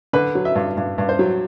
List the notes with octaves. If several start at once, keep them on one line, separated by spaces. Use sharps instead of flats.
D3 B4
F#3
E5
G2
G2
G2
C5
F#3